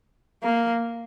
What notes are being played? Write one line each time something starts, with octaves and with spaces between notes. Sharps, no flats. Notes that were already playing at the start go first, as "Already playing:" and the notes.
A#3